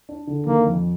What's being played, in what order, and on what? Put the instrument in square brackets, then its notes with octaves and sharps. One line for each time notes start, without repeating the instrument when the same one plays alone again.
[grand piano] D4
D3
[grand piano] D#3 [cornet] A#3
[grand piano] F2